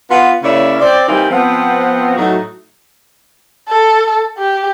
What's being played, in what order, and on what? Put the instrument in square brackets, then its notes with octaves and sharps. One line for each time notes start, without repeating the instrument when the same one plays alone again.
[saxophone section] B3 F4
C#3 A#3 C#4 E4 C#5 D5
C4 D5
E3 G3 A#3 C4 D#4 E4
F3 B3 C4
A2 F#3 A3 D#4 F#4
[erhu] A4
G4